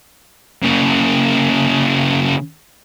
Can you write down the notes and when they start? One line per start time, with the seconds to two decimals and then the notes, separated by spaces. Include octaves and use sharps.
0.62 C#3 A#3